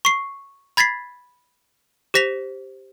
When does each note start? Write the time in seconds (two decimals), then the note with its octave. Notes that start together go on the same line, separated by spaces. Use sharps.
0.05 C#6 C7
0.77 B5 G#6 A6 B6 C7
2.14 G4 C5 A#6 B6 F7